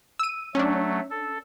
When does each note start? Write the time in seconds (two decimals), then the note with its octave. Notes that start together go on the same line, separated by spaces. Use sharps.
0.19 E6 D#7
0.55 F#3 A3 C#4 D4
1.11 A4